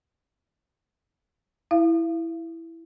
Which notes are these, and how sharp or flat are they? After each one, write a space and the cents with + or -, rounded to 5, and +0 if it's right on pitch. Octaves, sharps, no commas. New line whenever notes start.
E4 +0 F5 -30